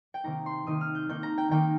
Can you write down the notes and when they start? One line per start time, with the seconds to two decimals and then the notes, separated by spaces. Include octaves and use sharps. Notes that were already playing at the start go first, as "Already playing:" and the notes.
0.14 G5
0.24 C3 D#3 A#3 D#4 A#5
0.46 C6
0.67 C3 D#3 A#3 D#4 D#6
0.81 F6
0.95 G6
1.09 D#3 A#3 D#4 G6
1.23 A#5
1.38 G5
1.51 D#3 A#3 D#4 G5